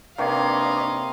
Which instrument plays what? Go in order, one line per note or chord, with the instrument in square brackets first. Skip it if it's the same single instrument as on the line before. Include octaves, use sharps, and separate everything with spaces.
[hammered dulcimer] C3 [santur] A#3 C#5 [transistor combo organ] D4 B4 D5 [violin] D#4 F5